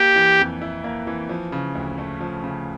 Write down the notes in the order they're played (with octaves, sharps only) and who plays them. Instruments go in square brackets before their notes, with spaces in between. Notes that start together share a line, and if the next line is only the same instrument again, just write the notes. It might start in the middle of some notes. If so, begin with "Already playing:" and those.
Already playing: [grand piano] A#3 [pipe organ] G4
[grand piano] E3
F2
E4
A#3
E3
F3
C#3
D2
A3
F3
C#3